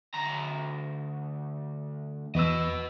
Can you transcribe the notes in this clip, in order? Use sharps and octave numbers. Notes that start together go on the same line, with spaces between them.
D2 A#5
E2 B4 D#5 E6